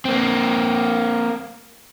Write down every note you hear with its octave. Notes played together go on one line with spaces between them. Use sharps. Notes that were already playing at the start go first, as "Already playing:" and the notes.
A#3 C4